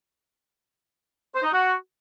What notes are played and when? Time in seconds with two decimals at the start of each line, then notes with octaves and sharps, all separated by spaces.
1.34 C5
1.43 D#4
1.52 F#4